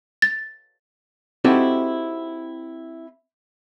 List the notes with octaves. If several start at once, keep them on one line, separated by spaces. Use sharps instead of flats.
A6
C4 D#4 E4 F#4 G4 A4